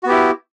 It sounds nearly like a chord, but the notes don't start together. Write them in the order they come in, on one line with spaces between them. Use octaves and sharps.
F#4 B3 G4 E4